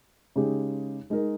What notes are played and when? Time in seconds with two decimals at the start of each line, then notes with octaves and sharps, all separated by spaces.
0.36 C#3 G#3 D#4 G4
1.10 G#3 D#4 A#4